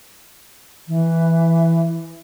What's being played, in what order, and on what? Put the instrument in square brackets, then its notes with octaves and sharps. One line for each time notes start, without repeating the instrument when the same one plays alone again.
[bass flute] E3